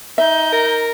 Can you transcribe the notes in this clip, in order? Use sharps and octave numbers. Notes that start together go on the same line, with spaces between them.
D#4 E5 G6
A#4